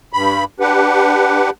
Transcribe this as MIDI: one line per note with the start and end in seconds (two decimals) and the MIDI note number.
0.13 0.44 43
0.13 0.44 83
0.60 1.50 62
0.60 1.50 67
0.60 1.50 71
0.60 1.50 78